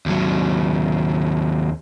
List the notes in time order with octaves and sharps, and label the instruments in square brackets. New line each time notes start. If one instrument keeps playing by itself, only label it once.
[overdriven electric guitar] D#2 F#3